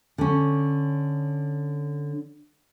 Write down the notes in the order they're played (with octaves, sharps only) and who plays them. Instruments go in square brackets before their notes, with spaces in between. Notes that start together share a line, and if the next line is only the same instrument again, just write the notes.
[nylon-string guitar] D3 C#4